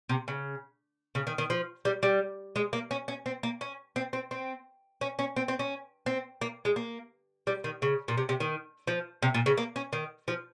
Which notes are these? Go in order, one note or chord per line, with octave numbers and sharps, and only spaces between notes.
C3
C#3
C#3
D#3
D#3
F3
G3
G3
G#3
A#3
C#4
C#4
C4
A#3
C#4
C4
C4
C4
C#4
C#4
C4
C4
C#4
C4
A#3
G#3
A#3
G3
D#3
C#3
A#2
C3
C3
D#3
F3
C3
A#2
C#3
A#3
C#4
D#3
F3